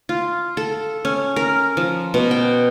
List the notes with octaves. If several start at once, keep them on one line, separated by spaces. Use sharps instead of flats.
F4
A4
C#4
A#4
F3
B2
G5